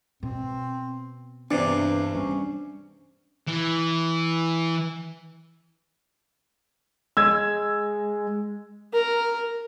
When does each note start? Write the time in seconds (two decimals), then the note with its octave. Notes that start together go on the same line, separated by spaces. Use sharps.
0.23 B2 C4
1.51 E2 G2 C3 D4
2.15 G3 C#4
3.48 E3
7.17 G#3 E6 G#6
8.94 A#4